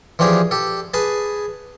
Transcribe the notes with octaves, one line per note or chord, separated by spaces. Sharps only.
E3 F3 D4 G4 G#4
G4 A4
G#4 B4 G#5 A5